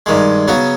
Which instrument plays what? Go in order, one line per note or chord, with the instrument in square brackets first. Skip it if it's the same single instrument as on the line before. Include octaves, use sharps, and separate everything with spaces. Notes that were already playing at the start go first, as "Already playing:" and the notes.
[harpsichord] G2 D#3 G#3
C#3 F#3 B3